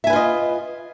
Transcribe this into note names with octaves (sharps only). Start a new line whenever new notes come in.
F4 B4 D#5 E5 G#5